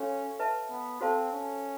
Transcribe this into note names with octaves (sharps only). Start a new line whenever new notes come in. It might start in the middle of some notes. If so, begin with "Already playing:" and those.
Already playing: C#4 F#4 A4 C#5 F5
B4 E5 A5
B3
C4 F#4 A4 C5 F5 A5
C#4